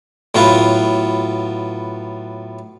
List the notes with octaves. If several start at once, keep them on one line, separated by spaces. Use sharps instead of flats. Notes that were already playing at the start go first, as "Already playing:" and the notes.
A2 F#3 B3 F4